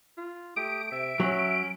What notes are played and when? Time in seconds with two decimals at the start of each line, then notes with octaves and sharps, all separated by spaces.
0.17 F4
0.56 A3 G4 D#6 D7
0.91 C3 E5
1.20 F#3 C#4